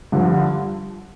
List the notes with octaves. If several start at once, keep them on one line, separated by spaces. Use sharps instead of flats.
G2 D3 F3